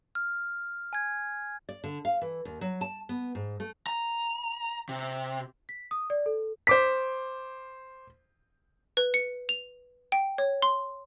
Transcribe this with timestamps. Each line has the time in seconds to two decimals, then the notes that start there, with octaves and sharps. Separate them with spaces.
0.15 F6
0.93 G#5 G#6
1.69 D5
1.84 D3
2.05 F5
2.21 E3
2.45 D#2
2.61 F#3
2.81 A5
3.09 B3
3.35 G#2
3.60 A3
3.87 A#5
4.89 C3
5.69 B6
5.91 D#6
6.10 D5
6.26 A4
6.67 C5 D6 B6
8.97 B4
9.14 C#7
9.49 F7
10.12 G5
10.38 C#5
10.62 C6